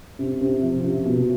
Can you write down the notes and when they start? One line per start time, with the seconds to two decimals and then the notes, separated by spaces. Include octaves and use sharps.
0.19 C3
0.41 C3
0.62 F3
0.84 C3
1.05 B2